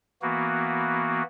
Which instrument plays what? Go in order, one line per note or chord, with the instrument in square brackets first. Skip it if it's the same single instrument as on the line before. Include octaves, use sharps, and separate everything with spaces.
[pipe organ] E3 A#3 B3 F#4